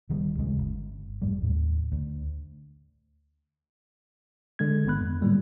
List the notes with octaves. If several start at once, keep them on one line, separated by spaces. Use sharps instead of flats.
D1 D#3 G3
A1 D2 C#3 G#3
G1
F#2 A2 G3
D#2 A2
D2
D3 G#3 G#6
A1 G#2 D#3 B3 B5 F#6
F2
A2 D3 F#3 G3 A#3